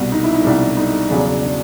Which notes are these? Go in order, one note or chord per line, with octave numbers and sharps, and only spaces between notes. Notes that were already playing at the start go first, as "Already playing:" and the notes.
Already playing: C2 B2 G3
D#4
E4
D#4
C2 B2 G3 D4
D#4
E1 E2 C#3 F#3 D4
D4